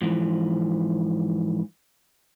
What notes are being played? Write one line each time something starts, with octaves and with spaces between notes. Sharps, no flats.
G#2 E3 F3